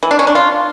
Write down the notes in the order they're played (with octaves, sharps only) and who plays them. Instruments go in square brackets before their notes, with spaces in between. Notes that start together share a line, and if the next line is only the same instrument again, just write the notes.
[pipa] E3
D4
C#4
D4
F4